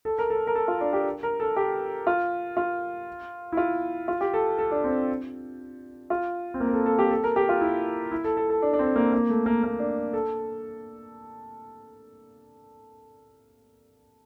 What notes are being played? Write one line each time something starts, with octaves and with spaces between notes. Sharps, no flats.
A4
A#4
A4
A#4
A4
F4
D4
G4
A#4
A4
G4
F4
F4
E4
F4
F4
G4
A4
A4
D4
C4
F4
C4
A#3
A#4
A4
A4
G4
A4
A#4
G4
F4
E4
E4
A4
A4
A4
D4
D4
C4
A#3
A#3
A3
A#3
A#3
D4
A4